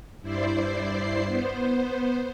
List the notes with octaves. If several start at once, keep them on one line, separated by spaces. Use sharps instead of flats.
G2 E4 C5 D5 C7
B3 C5